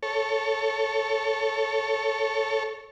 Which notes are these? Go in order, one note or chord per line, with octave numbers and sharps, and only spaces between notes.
A4 C#5